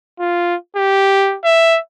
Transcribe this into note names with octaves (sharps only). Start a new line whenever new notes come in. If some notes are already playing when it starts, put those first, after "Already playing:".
F4
G4
E5